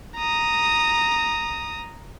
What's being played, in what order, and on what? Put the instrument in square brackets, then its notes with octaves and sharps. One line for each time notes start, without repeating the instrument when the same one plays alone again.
[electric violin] A#5 D#6